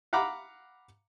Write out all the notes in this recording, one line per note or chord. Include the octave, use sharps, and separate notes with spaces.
F5 F#5 A#5 B5 D6